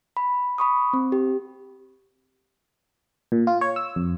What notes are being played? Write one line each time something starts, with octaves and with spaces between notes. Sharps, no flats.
B5
B5 C#6 D#6
C4
G4
A#2
F4
C#5
E6
F2